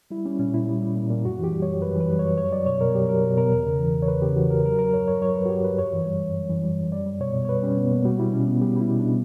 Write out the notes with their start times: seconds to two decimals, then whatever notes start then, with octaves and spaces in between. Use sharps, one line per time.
0.11 G3 E4
0.25 G3 C#4
0.39 A#2 C#4
0.53 A#2 E4
0.68 G3
0.82 G3
0.96 A#2
1.10 A#2
1.24 F#2 F#4
1.39 E3 G4
1.52 G3
1.62 C#5
1.67 F#2
1.82 F#2 B4
1.95 E3
2.00 B4
2.10 G3
2.19 F#2 C#5
2.37 F#3 C#5
2.52 F#3 D5
2.66 B2 C#5
2.81 B2 A#4
2.95 F#3 G4
3.09 F#3 A#4
3.24 B2
3.37 B2 A#4
3.52 E2
3.66 C#3
3.79 E3
3.94 E2
4.02 C#5
4.08 E2 B4
4.22 C#3 G4
4.36 E3 F#4
4.50 E2 A#4
4.65 F#3 A#4
4.79 F#3 A#4
4.94 G2 C#5
5.08 G2 C#5
5.22 F#3 C#5
5.36 F#3 B4
5.46 F#4
5.49 G2 G4
5.64 G2 B4
5.78 F#2 C#5
5.93 E3
6.06 G3
6.20 F#2
6.35 F#2
6.49 E3
6.64 G3
6.77 F#2
6.92 G3 D5
7.06 G3
7.20 B2 C#5
7.34 B2
7.45 C#5
7.48 G3 B4
7.63 G3 C#4
7.77 B2 B3
7.91 B2 A#3
8.05 G3 F#4
8.19 G3 E4
8.33 B2 C#4
8.47 B2 B3
8.62 G3 G4
8.76 G3 E4
8.91 B2
9.00 D4
9.05 B2